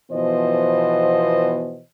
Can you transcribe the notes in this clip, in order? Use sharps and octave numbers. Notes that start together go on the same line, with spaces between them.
B2 E3 F3 B3 C5 D#5